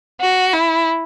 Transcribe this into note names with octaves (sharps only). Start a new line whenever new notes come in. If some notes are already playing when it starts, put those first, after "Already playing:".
F#4
E4